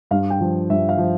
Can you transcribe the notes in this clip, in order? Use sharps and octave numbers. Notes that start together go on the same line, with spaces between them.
G2 F5
G5
F3
G2 E5
F5
F3